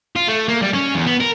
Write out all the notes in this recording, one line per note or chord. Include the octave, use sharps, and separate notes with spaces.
F4
A3
A#3
G3
C#4
E2
B3
A#4